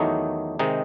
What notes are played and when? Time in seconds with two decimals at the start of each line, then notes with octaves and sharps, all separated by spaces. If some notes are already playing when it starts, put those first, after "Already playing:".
Already playing: E2 D#3 F#3 A3 D#4
0.59 C3 D#3 G#3 D#4